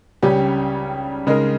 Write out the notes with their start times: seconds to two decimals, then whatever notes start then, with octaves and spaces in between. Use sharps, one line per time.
0.22 C#2 C#3 G3 C#4 G4
1.27 C#3 G#3 D#4 A#4